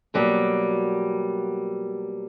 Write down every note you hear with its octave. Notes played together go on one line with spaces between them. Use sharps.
B2 F#3 G3 A#3